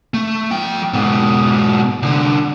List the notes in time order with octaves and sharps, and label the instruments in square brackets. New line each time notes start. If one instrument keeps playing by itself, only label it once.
[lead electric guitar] A3
F3 G5
G#2 B2
C2 D3